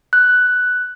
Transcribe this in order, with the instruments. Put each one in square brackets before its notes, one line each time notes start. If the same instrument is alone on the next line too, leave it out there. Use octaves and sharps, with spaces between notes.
[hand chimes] F#6